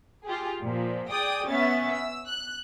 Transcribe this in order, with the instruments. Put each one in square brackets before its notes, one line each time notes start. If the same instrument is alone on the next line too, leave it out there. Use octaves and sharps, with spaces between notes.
[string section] F4 G4 G#4
A#2 F3
G#4 D5 G5 D#6
B3 C#4 E5 A6
E6
F#6